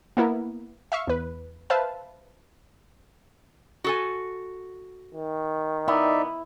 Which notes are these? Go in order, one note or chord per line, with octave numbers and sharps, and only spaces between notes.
A#3 B3 E4 A#4
E5 F5 C#6
E2 B4
B4 C5 E5 F5 A5
F#4 A4 G#5
D#3
B3 D#4 E4 D5 E5